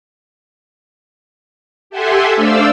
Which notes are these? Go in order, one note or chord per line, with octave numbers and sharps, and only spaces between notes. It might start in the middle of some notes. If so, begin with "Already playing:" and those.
G4 A4 E5 F#5 G#5 C6
A3 D4 C5 D5 F5 E6